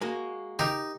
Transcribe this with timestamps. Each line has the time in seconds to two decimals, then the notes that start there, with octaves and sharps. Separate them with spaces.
0.01 G#3 A#3 F#4
0.59 D#4 G4 A#4